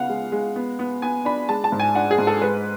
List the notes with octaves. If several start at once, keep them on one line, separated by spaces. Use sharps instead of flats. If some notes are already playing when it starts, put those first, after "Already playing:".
Already playing: C#3 B3 F5 F#5
G#3
G#3
B3
B3
B3 G#5
D4 B5
G#3 A5
A5
G#2
G#5
D4 F#5
G#4
G#2
A4
G#3 B4